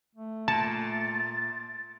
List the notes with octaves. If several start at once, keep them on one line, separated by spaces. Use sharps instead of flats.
A3
A#2 A5 A6